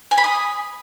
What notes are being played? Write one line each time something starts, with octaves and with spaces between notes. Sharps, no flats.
G#5
B5
D#6